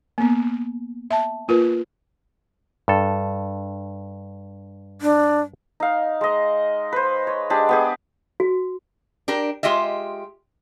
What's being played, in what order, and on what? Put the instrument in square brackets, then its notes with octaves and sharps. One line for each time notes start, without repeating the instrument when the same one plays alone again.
[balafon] A#3 B3
E5 A5
A#3 F4 A#4 B4
[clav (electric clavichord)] G2 A4
[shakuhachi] D4
[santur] D#4 F5
G#3 D#5
B4 C5
C#5
G#3 D4 G4 G#4
B3 G4 G#4
[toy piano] F#4
[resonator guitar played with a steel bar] D4 G4 A#4
G#3 F4 G4 D#5 E5